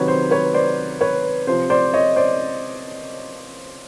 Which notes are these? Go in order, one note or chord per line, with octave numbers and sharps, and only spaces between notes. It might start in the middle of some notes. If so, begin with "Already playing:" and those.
Already playing: C3 D#3 F#3 B4 C#5
C5
B4 C#5
C5 D5
B4 C#5
C3 F3 C5
C5 D5
C#5 D#5
C5 D5